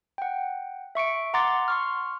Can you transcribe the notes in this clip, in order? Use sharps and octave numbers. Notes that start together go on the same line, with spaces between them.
F#5 G5
E5 C#6 C#7 D7
F#5 A#5 C6 D6 A6
C6 C#6 F6